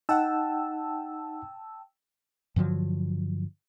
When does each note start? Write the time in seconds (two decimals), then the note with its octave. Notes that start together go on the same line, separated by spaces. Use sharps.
0.09 D#4 F#5 G5 A5 E6
2.56 G2 D3 F3 F#3